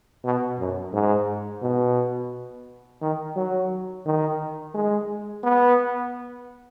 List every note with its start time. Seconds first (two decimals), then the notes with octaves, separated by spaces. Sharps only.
0.24 B2
0.59 F#2
0.93 G#2
1.62 B2
3.02 D#3
3.36 F#3
4.06 D#3
4.74 G#3
5.44 B3